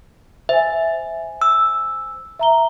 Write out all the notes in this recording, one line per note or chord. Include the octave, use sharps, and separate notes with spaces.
C5 E5 G#5
E6
E5 A#5 G7